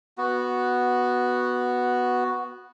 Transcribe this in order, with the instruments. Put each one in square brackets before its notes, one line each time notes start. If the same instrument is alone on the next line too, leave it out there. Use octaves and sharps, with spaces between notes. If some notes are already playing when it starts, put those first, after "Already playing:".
[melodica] B3 F#4